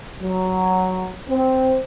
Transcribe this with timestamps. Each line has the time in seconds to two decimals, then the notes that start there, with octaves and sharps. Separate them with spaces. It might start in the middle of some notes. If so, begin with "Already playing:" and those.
0.22 F#3
1.29 C4